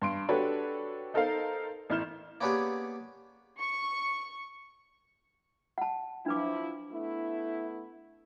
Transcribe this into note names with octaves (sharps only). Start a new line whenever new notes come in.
G2 C6 D7
D4 F#4 G4 A4 B4 C#5
D#4 A4 A#4 C5 F5
A1 E4 F6 G6 E7
A#3 B3 C#4 D4 G4 G#4
C#6
F#5 A5
F3 D4 E4 B4 D6
A3 B3 E4